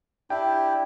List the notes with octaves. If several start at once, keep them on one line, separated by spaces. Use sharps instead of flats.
D4 E4 G4 G5